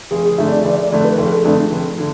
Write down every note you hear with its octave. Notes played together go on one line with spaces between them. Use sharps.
F1 G#4
G#4
F2 D3 A3 D4 E5
D5
F1 D5
D5
F2 D3 A3 D4 D5
B4
F1 A4
G#4
A4
F2 D3 A3 D4
F1
D3